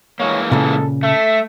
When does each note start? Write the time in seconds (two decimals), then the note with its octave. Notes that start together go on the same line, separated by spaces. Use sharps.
0.20 E3 G#3 A#3 C#5
0.51 A#2 C#3 A4
1.03 A3 E5